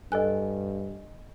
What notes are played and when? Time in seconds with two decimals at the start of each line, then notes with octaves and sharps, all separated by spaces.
0.12 G2 A4 D#5 G#5 F#6